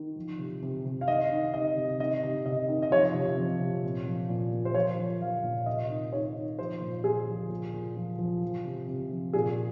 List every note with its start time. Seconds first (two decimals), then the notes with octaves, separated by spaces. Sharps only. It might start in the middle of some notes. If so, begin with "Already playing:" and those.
Already playing: D#3
0.16 F3
0.38 C3
0.63 C3
0.85 C3
1.01 F5
1.08 D#3 D#5
1.31 D#3
1.54 C3 D#5
1.76 C3
2.00 D#3 D#5
2.23 C3
2.46 C3 D#5
2.68 D#3
2.82 D#5
2.91 F3 C#5
3.14 C3
3.38 F3
3.60 C3
3.84 A#2
4.07 F3
4.29 A#2
4.52 A#2
4.65 C5
4.74 F3 C#5
4.99 F3
5.21 F3 F5
5.43 A#2
5.66 C3 D#5
5.90 D#3
6.13 D#3 C#5
6.36 D#3
6.58 F3 C5
6.81 A#2
7.04 A#2 G#4
7.27 F3
7.50 A#2
7.74 A#2
7.96 F3
8.19 F3
8.43 F3
8.65 C3
8.88 C3
9.11 F3
9.33 A#2 G#4